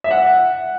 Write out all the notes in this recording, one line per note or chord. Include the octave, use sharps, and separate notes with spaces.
E5
F#5